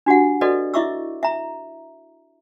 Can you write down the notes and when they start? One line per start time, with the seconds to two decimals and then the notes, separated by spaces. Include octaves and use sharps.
0.06 D4 F#4 G4 F#5
0.41 F#4 A4 B4 D5 D#5
0.74 E4 D#5 E5 C#6 D6 E6
1.23 E5 A#5